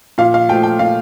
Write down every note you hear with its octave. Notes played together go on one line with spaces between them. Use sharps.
A#2 F5
F5
F3 A3 G5
G5
A#2 F5